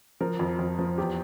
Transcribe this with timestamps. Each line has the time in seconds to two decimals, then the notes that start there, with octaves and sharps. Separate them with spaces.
0.21 F3 A#4
0.39 F2
0.59 F2
0.79 F3
0.98 E2 G4